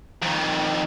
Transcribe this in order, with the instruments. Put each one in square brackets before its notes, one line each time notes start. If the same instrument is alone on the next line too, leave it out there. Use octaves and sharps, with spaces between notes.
[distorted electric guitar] F2 D#3